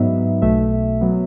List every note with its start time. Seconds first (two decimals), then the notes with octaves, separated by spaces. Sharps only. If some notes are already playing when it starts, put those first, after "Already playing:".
Already playing: G#2 F#3 B3 D#4 E5
0.42 B1 B2 A3 E5
1.01 F#3 B3